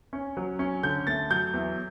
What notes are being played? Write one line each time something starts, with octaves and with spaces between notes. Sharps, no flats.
C#4
F#3
C#4
D3 G6
A3 A6
F#3 G6
E2